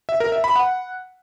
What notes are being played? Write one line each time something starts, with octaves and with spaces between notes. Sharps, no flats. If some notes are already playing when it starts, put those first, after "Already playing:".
E5
A#4
E5
B5
F#5